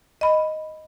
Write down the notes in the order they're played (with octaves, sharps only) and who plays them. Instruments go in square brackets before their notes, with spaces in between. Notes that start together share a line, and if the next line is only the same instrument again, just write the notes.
[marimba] D#5 B5